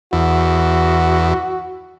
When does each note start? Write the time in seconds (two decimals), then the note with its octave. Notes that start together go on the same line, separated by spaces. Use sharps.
0.13 E2 F#4